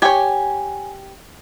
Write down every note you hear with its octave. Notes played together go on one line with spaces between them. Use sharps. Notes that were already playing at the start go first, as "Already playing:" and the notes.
G4 C#5 G#5